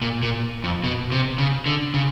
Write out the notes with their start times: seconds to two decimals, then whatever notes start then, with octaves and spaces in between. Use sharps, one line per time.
0.02 A#2
0.23 A#2
0.64 F2
0.84 B2
1.12 C3
1.38 C#3
1.66 D3
1.94 C#3